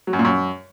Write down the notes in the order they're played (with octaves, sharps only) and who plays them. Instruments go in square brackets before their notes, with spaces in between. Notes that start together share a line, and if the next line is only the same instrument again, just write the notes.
[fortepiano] F#3
F#2
A#2
F#2